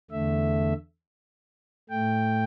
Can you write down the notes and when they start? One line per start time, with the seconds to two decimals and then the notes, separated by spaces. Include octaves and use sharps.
0.11 E2 D3 A3 E5
1.89 A2 A3 G5